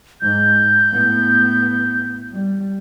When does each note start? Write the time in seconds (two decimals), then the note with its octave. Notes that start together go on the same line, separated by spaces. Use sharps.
0.21 G#2 G6
0.92 A2 B3
2.32 G3